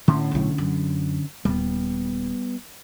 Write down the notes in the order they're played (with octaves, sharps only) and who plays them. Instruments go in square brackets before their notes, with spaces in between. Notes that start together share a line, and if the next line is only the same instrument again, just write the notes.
[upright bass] A2 [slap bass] D3 C#4
[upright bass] B1 A2
F#2
[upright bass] D#1 [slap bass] G3 B3